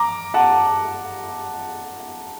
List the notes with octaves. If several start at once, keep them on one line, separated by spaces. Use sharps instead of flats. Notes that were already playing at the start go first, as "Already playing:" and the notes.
Already playing: A#5 D6
F#5 A5